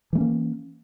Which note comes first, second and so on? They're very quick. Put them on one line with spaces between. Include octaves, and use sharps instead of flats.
E3 A3 C#4 A#3